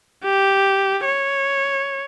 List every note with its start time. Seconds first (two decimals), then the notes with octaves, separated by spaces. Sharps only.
0.24 G4
1.05 C#5